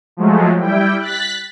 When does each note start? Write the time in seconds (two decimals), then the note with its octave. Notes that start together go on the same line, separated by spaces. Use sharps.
0.17 F3 F#3 G#3 A3
0.59 G3 E4 G5
1.00 F#6 A6 B6